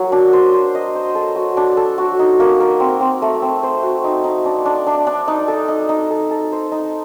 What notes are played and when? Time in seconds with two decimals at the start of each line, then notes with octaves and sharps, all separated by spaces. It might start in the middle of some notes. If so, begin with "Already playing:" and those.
Already playing: F#3 A#3
0.12 D4
0.33 C5
0.53 C5
0.75 D#5
0.95 C5
1.15 A4
1.36 F#4
1.57 D4
1.77 A4
1.98 F#4
2.19 D#4
2.40 A#3
2.60 A#4
2.80 C4
3.01 C4
3.22 A3
3.42 C4
3.63 C5
3.83 F#4
4.04 D#4
4.24 D#4
4.45 D4
4.65 D4
4.87 D4
5.07 D4
5.28 D#4
5.48 A4
5.68 D#4
5.89 D#4
6.10 A4
6.31 A4
6.52 C5
6.72 D#4